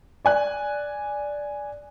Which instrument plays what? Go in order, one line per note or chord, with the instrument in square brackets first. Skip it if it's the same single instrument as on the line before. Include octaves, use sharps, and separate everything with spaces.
[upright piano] D5 G#5 F#6